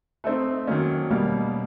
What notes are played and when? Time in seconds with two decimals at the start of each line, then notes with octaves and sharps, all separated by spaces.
0.24 A3 C4 D#4
0.67 D#3 F#3 A#3 C#4
1.10 B2 G3 A#3